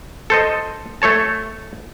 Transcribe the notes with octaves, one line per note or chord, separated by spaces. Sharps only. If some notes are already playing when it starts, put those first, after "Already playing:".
A4 C5 D#5
A3 A4 C#5 A5